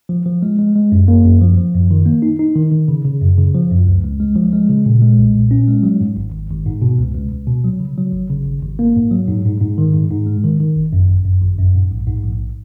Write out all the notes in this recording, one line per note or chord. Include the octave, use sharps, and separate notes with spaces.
F3
F3
G#3
G#3
G#3
F#2
A#3
F#2
F3
F3
F#2
D#3
A#3
D#4
D#4
D#3
D#3
C#3
C#3
F#2
C#3
F3
F#2
C#2
C#2
G#3
F3
G#3
C#3
A#2
G#3
B1
A#2
C#4
G#3
F#3
G#2
G#1
G#1
G#1
G#2
B2
C#2
C#2
C#2
B2
F#3
C#3
F#3
G#1
C#3
G#1
G#1
A#3
G#2
F#3
G#2
G#2
G#2
D#3
G#2
G#2
G#3
D#3
D#3
G#1
F#2
G#1
F#2
G#1
F#2
G#2
A#1
G#2
A#1